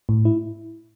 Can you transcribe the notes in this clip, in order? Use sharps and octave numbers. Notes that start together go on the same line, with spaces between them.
A2
E4